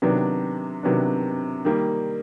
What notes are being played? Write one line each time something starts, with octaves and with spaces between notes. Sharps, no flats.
C3 D#3 F#3 B3 D4
C3 D#3 F#3 B3 D4
D#3 G3 A#3